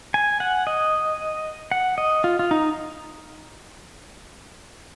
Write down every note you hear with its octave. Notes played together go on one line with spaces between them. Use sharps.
G#5
F#5
D#5
F#5
D#5
F4
F4
D#4